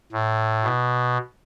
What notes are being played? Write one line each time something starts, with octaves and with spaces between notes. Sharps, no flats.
A2
B2